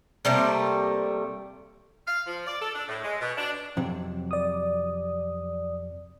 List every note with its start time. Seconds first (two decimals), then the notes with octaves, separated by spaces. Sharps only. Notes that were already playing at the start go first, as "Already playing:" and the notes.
0.25 C3 G3 A3 A#3
2.08 F5
2.27 F3
2.46 D5
2.61 A4
2.74 D4
2.88 A2
3.03 G#3
3.19 B2
3.38 D4
3.77 F2 C3 F#3
4.31 D5 D#6